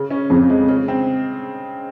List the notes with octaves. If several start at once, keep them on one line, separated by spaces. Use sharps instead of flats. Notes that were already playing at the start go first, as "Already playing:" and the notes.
Already playing: C#3
C#4
F2 C#3
G#3
C#3
C4